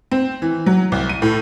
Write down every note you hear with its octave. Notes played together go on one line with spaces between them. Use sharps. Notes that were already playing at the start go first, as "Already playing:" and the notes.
C4
E3
F#3
C2
D#7
A2